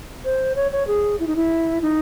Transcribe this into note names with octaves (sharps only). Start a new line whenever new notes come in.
C5
C#5
C#5
G#4
E4
D#4
E4
D#4